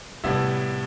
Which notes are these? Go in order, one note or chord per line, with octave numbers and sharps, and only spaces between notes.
A2 C3 G3 B3 E4